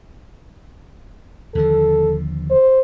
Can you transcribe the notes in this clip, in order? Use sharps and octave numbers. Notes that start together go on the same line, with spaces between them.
D#2 D3 F3 A4
C5